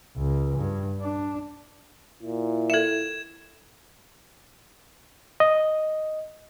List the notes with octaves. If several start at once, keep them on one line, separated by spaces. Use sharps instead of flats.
C#2
G2
D4
A#2 E4
A4 E5 G#6 E7
D#5